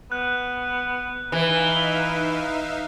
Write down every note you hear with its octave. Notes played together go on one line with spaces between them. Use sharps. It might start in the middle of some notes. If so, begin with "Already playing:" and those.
B3 F#6
E3 D#4 B4 E5 F5